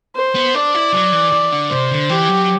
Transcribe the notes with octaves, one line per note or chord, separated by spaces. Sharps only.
C5
B3
D4 D5
E4
F#3
E3
E3
D3
C3 C5
D3
E3 G4
F#3